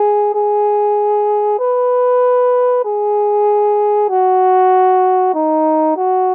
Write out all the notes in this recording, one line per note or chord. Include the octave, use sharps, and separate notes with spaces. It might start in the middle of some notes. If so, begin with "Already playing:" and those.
Already playing: G#4
G#4
B4
G#4
F#4
D#4
F#4